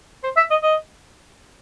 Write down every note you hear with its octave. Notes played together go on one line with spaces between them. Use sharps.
C5
E5
D#5
D#5